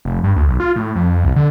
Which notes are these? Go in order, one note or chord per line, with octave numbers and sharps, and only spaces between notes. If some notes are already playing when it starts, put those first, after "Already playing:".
F1
G2
D2
B1
F4
A2
F2
C2
D3